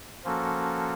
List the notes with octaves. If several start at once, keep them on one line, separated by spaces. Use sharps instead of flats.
F3 A#3 C#4 F#4 A4